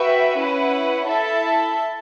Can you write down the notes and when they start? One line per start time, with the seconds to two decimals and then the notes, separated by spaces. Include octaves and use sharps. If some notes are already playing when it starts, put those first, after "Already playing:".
Already playing: F#4 B4 E5 G5
0.39 C#4 E4 B4 F#5
1.08 E4 A4 E5 A5